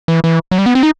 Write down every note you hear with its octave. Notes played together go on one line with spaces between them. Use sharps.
E3
E3
F#3
G3
B3
C4
D#4